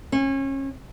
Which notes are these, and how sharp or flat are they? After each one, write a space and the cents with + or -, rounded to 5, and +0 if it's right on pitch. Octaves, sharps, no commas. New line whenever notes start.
C#4 -30